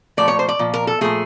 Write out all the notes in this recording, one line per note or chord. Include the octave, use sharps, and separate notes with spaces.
A#2 F3 A3 D5
C#5
C5
D5
A#2 F3
A#4
A4
A#2 F3 A3 G#4